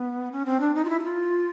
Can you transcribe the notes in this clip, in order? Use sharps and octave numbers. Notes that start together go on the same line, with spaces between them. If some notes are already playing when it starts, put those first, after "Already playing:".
Already playing: B3
C#4
C4
D4
D#4
F4
E4
F#4
F4